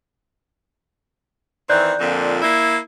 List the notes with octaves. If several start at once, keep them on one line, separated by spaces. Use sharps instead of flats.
D#3 E3 C4 D5 F#6 G6
F2 A#2 D3
A#3 E4